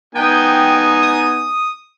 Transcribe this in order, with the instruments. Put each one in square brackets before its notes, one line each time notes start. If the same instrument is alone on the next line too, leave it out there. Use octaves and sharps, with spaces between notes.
[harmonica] B3 D#4 G#5 [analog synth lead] G5
[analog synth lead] D#6